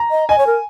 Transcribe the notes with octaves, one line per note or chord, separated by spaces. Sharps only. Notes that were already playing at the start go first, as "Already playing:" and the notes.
Already playing: A#5
D#5
D#5 G#5
C#5
A#4